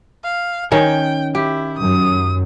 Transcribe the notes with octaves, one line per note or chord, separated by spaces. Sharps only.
F5
D#3 C#4 G5
E4 G4
F#2 D#6